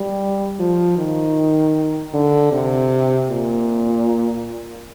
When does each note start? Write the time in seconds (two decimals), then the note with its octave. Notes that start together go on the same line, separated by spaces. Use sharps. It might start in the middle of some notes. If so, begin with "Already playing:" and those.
Already playing: G3
0.59 F3
0.98 D#3
2.14 D3
2.52 C3
3.29 A#2